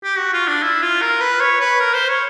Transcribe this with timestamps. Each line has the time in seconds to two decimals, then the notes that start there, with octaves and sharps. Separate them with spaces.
0.04 G4
0.18 F#4
0.33 F4
0.48 D4
0.62 E4
0.82 F4
1.02 A#4
1.21 B4
1.41 C#5
1.60 B4
1.80 A#4
1.94 C5
2.09 C#5